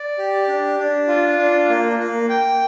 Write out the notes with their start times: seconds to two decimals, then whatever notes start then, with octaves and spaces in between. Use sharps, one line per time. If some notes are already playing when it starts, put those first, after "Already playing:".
Already playing: D5
0.18 G4
0.48 D4
0.79 D4
1.08 F4
1.38 D4
1.69 A#3
1.99 A#3
2.29 G5